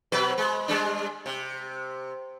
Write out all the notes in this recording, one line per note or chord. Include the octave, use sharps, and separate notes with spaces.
B2 F#3 B4
G#3
G3 G#3 D4
C3